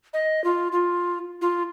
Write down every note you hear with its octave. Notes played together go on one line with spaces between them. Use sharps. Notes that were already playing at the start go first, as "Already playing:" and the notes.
D#5
F4
F4
F4